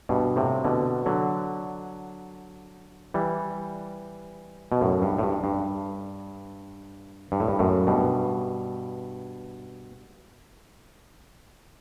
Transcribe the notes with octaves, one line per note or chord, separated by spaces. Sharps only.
G2 B2
A2 C3
B2 D3
D3 F#3
E3 G3
B2
F#2 A2
G2
A2
G2
G2
G2
A2
G2
F#2 A2
G2 B2